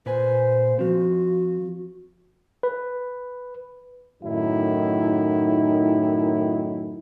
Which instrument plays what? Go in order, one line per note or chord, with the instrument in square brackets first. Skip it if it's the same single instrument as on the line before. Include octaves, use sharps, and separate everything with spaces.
[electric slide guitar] A#2 B4 G#5 [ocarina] C5
[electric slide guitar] F3 C4 [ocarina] F#4
[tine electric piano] B4
[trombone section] F#2 A2 D#3 D#4 E4